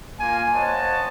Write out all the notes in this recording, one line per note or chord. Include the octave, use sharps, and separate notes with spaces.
A#3 F4 G#5
C5 C#5 D#5 F#5 A5